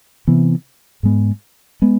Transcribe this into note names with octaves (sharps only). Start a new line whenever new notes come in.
C3 E3 B3
G#2 G#3 B3
G#3 B3